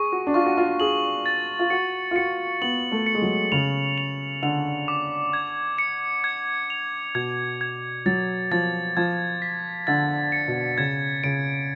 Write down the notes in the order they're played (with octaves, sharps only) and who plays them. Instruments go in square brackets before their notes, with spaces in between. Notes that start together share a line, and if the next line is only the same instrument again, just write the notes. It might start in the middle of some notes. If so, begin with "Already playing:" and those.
Already playing: [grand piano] G#4 [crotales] C#6
[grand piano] F#4
D4
[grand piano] F4 [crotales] C#6
[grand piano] F#4
F4
[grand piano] G#4 [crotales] F#7
[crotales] A6
[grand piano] F4
[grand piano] F#4 [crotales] C#7
[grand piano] F4
[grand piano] F#4 [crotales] C#7
[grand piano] B3 [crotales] F#7
[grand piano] A3
[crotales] C#7
[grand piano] G#3
F#3
[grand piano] C#3 [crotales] F7
[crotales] F7
[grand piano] D3 [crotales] F7
[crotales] D6
G#6
C#7
G#6
F7
[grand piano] B2 [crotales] G#6
[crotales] G#6
[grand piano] F#3 [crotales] A6
[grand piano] F3 [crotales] A6
[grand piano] F3 [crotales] G#6
[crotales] B6
[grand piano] D3 [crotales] A6
[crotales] C#7
[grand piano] B2
[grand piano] C#3 [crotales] G#6
[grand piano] C#3 [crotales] D7